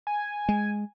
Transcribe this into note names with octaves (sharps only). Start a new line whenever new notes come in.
G#5
G#3